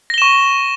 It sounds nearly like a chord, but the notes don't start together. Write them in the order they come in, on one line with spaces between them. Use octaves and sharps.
A#6 G7 E7 C#6